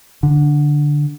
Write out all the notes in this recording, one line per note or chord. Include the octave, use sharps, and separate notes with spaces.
D3